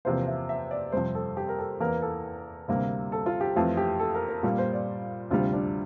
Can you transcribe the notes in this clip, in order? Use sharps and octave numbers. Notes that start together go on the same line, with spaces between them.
E2 C3 F3 A#3 C5
E5
E5
D5
F2 C3 G3 C5
A4
G4
A#4
A4
E2 E3 A#3 A#4
A4
D2 C3 G3 A#3
A4
F4
G4
F2 E3 A3 F4
G4
A4
A#4
A#4
A#2 G3 A#3
C5
D5
D2 C3 G3 F4
D4